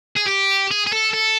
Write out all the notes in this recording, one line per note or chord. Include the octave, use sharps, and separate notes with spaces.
G#4
G4
G#4
G#4
A4
A4